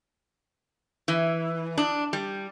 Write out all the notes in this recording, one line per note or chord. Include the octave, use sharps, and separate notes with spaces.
E3
D4
G3